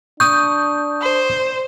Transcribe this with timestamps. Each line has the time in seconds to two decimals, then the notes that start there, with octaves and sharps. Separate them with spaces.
0.20 D4 C#6 D#6 G6
1.02 C5